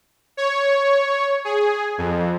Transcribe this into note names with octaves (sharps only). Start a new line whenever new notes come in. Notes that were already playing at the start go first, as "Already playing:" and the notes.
C#5
G#4
F2